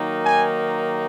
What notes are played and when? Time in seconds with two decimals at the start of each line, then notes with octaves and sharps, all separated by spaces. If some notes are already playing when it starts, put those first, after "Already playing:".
Already playing: D#3 F#3 A#3 D#4
0.24 G#5